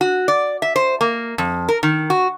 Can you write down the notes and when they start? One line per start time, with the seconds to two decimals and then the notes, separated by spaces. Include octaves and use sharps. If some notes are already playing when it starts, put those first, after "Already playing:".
0.01 F#4
0.28 D5
0.62 E5
0.76 C5
1.01 A#3
1.38 F2
1.69 A#4
1.83 D#3
2.10 F#4